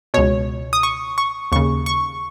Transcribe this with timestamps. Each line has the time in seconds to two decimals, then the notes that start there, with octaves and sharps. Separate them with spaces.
0.14 C#2 B2 C#5
0.73 D#6
0.83 C#6
1.18 C#6
1.52 D#2 C#3 C#6
1.86 C#6